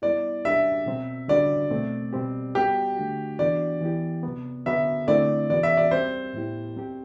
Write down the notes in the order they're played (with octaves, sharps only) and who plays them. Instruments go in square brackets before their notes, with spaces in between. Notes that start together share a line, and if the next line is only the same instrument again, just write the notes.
[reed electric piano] G3 B3 E4 [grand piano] D5
[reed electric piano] G3 D4 G4 [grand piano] E5
[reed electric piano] B2 F#3 C4
[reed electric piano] D3 G3 D4 F#4 [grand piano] D5
[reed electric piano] B2 A3 C4
B2 G3 C4 G4
[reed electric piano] G3 B3 F#4 [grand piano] G4
[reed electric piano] D3 A3 D4 F#4
[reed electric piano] E3 B3 D4 F#4 [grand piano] D5
[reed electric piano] E3 B3 E4 G4
C3 F#3 B3
[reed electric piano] D3 F#3 B3 F#4 [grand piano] E5
[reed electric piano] D3 A3 C4 E4 [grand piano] D5
[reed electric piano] E3 B3 F#4 [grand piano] D5
[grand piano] E5
D5
[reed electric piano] G3 C4 G4 [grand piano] C5
[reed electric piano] A2 F#3 B3 E4 G4
F#3 C4 G4